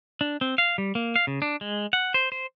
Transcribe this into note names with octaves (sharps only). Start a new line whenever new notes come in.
D4
C4
F5
G3
A#3
F5
C#3
D4
G#3
F#5
C5
C5